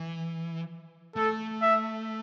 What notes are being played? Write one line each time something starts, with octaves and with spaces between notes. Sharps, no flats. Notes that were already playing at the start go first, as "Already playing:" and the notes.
Already playing: E3
A3 A4
E5